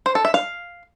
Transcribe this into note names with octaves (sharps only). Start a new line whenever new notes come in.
C5
A4
E5
F5